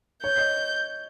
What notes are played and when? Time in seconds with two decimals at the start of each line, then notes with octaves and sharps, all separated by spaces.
0.24 C#5 G6
0.38 D#5